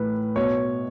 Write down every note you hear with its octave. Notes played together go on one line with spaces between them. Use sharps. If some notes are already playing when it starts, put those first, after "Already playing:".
Already playing: A2 E3 B4
B2 C#5